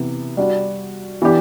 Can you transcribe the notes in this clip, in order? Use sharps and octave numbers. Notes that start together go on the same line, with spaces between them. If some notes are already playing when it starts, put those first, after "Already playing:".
Already playing: C3 E3 B3
G3 D4 F#4
E3 B3 D4 G4